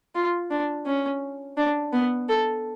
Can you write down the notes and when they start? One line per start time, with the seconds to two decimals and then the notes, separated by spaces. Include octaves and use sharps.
0.15 F4
0.51 D4
0.86 C#4
1.57 D4
1.93 B3
2.28 A4